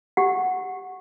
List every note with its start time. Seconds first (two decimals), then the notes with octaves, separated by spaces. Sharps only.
0.17 G4 F#5